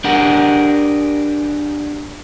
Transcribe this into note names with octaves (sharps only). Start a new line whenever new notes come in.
D4 G4 G#4 A#4 F#5